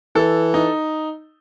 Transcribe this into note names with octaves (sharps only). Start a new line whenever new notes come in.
E3 A4
D#4